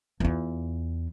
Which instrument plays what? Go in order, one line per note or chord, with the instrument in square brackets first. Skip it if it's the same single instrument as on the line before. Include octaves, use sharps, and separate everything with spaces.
[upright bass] E2 F4